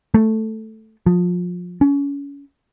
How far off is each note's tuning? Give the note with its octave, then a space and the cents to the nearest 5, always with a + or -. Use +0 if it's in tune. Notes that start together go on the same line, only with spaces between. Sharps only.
A3 +0
F3 +25
C#4 +30